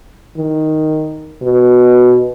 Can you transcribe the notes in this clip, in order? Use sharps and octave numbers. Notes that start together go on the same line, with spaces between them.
D#3
B2